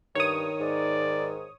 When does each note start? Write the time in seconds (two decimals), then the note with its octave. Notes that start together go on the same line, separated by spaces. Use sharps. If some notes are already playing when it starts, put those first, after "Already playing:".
0.15 G2 D#3 C#5 D#6
0.60 G#2 D5